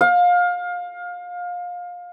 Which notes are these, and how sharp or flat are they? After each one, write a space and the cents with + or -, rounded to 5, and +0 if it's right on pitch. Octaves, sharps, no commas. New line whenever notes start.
F5 +25